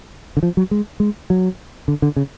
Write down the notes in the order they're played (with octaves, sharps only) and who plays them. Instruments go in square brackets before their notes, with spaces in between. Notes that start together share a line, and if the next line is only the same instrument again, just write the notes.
[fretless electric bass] D3
F3
F#3
G#3
G#3
F#3
D3
D3
C#3